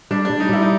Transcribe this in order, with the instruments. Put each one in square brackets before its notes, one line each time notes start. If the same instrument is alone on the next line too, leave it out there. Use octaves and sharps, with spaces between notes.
[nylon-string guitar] G3 [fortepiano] D4
[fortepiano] D4
[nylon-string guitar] G3
[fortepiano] D#4
[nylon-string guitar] G3 [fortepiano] E4
[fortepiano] D#4